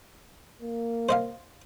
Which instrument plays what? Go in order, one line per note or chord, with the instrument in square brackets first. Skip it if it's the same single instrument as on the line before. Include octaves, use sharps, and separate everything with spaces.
[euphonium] A#3
[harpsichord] C5 D#5 F5